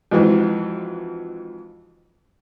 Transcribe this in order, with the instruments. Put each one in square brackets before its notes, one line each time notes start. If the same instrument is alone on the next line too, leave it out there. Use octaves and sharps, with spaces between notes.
[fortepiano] F2 G#2 E3 F#3